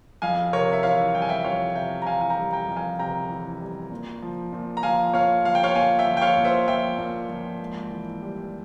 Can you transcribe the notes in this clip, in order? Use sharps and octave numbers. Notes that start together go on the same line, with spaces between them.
F2 F5 G#5
C3 A#4 C#5
E5
E3 C#5 F5
G3 G5
G#5
E5 G5
F2 C#5 F5
C3 E5 G5
A#5
E3 F5 G#5
G#5
G5 A#5
G3
G5 A#5
F2
F5 G#5
C3 G5 A#5
E3
G3
A#2
F3
A#2
A#5
F3 F5 G#5
A#2 C#5 F5
F3 F5
G5
C#5 F5
A#2 F5 G#5
E5 G5
F3
G5
C#5 F5
A#2
C5 E5
F3 E5 G5
A#2
F3
G#2
E3
G3